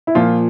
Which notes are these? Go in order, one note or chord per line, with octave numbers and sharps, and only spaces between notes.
E4
A#2 F3 F4